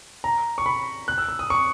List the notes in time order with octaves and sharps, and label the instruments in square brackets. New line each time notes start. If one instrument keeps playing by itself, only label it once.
[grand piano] A#5
C#6
B5
F#6
E6
E6
D#6
C#6